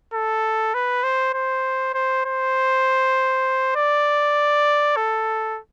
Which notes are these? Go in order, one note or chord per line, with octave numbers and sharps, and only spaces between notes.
A4
B4
C5
C5
C5
C5
D5
A4